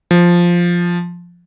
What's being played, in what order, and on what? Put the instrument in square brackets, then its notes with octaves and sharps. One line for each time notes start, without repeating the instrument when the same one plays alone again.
[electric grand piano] F3